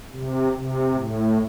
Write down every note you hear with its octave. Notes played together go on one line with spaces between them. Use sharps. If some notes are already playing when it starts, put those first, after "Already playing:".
C3
C3
A2